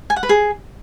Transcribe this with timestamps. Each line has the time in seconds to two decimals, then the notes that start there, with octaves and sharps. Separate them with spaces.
0.10 G#5
0.16 F#5
0.23 B4
0.29 G#4